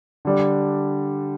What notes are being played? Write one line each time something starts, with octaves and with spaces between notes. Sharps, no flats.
D3 G3 D4